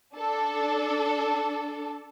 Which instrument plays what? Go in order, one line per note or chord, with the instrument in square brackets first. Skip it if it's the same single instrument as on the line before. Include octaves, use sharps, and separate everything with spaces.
[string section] D4 A4